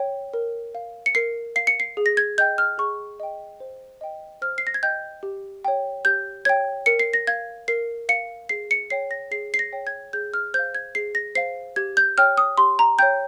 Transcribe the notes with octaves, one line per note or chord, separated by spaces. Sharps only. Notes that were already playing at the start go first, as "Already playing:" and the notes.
Already playing: C#5 G5
A#4
F5
C#7
A#4 C7
F5 C7
C#7
C7
G#4
A#6
G#6
D#5 G5 G6
F6
G#4 C#6
D#5 G5
C5
D#5 G5
C5 F6
C7
A#6
G#6
D#5 G5 G6
G4
C#5 G5
G4 G6
C#5 G5 G#6
A#4 C#7
C7
A#6
F5 G#6
A#4 C7
F5 C#7
G#4 C7
C#7
C#5 G5 C7
A#6
G#4 C7
C7
A#6
C#5 G5
G#6
G#4 G6
F6
C5 F5 G6
G#6
G#4 C7
A#6
C5 F5 C7
G4 G#6
G6
C#5 G5 F6
D#6
G4 C6
A#5
C#5 G5 G6